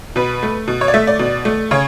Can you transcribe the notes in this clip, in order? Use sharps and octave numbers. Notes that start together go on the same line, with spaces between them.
B2 B4
A3
B2
C#5
D5
A3 E5
D5
B2
A3
C#3 C#5